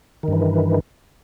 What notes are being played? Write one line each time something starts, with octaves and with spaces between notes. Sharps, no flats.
G2 D#3 E3